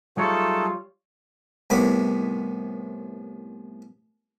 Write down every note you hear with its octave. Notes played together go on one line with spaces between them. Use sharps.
F#3 G3 A3 D#4 F4 G#4 A4 C#5
C2 A2 D#3 B3 B5 D6